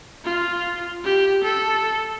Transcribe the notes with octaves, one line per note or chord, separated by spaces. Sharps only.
F4
G4
A4